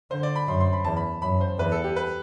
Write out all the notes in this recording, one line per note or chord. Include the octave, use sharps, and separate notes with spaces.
D3 C5
D5
B5
F#2 C6
C6
B5
E2 A5
B5
F#2 B5
C5
E2 B4
A4
G4
B4